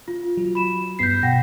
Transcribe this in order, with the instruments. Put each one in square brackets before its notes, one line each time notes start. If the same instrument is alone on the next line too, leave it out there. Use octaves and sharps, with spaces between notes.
[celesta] F4
[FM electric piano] F#3
[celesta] B5 E7
[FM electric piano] G2 B3 B6 [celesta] G6 C7
[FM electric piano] B2 [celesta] F#5 G5 A#6